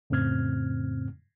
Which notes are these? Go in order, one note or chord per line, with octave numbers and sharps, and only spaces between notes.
F2 A2 C#3 C4 F6 G#6